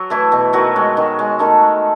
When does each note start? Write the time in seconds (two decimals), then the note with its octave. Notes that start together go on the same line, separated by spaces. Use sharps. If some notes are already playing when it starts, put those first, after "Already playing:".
Already playing: F#3 F#4
0.10 E3 A3 E4
0.32 B2
0.53 D#3 F#3 F#4
0.76 G#3
0.97 D#3
1.19 G#3
1.39 D#3 A3 A4
1.60 G#3